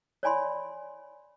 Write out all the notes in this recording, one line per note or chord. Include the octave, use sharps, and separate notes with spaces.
C#5 D5 G#5 B5 C6